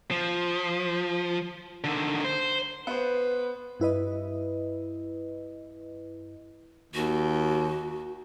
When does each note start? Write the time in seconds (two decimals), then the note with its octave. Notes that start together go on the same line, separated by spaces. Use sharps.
0.11 F3
1.84 D3 D#3
2.24 C5
2.87 B3 B4 C5
3.80 G2 E4 B4 D#5
6.94 D#2 F#4